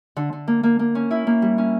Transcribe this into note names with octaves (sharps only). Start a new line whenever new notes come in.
D3
D3
A#3
A#3
A#3
C#4
E4
A#3
G3
C#4